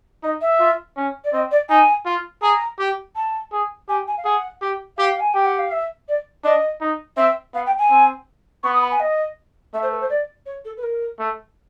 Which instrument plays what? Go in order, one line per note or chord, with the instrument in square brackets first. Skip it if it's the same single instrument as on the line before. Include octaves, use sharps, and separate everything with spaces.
[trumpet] D#4 [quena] D#5
[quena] E5
[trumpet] F4
C#4
[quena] D5
[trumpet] C4 [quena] D#5
[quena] D5
[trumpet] D#4 [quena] G#5
[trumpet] F4
[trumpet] G#4 [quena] A#5
[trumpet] G4
[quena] A5
[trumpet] G#4
[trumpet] G4 [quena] G#5
[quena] G#5
F5
[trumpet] G#4 [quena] F#5
[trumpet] G4
[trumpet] G4 [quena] F5
[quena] G#5
[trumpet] G4 [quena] G5
[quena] F#5
F5
E5
D5
[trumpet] D4 [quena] D#5
[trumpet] D#4
[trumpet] C4 [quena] E5
[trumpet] B3 [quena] F5
[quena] G5
G#5
[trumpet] C4
[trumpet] B3 [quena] C#6
[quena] D#6
B5
G#5
D#5
[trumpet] A3 [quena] E5
[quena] C5
B4
C5
D5
C#5
A4
B4
A#4
[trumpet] A3